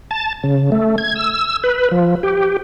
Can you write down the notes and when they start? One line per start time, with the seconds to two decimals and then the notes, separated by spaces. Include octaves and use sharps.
0.11 A5
0.43 C#3
0.72 A3
0.98 G#6
1.16 E6
1.64 B4
1.91 F3
2.23 G4